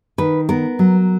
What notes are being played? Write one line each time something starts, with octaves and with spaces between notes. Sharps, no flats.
D#3 B4
B3 A#4
F#3